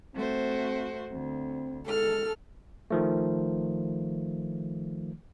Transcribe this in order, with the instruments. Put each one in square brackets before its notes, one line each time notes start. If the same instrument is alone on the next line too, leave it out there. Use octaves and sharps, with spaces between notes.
[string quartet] A3 F#4 C5 [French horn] C4
[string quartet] D2 [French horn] C4
[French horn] G#3 [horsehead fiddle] A4 [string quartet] F6
[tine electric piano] D#3 F3 A3